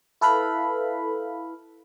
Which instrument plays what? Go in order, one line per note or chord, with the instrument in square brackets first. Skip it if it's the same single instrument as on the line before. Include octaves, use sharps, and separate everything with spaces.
[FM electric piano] E4 A4 B4 F5 B5